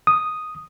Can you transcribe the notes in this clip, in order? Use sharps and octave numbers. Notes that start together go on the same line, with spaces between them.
D#6